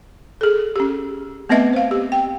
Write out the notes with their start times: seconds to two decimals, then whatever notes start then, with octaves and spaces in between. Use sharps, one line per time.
0.41 G#4 A4
0.76 C#4 G4
1.49 A3 B3 C4 B4 D#5 E5
1.73 C5 F5
1.91 G4
2.12 G5